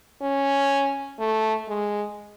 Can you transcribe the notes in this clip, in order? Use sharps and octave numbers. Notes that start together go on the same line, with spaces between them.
C#4
A3
G#3